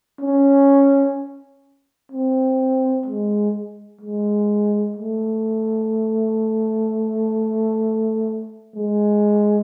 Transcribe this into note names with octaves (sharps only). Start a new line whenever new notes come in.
C#4
C4
G#3
G#3
A3
G#3